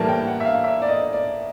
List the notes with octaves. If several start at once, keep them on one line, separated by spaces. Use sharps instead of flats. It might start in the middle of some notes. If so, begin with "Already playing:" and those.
Already playing: A2 E3 G3 A#3 A5
G5
F#5
E5
F5
E5
D5
D#5
D5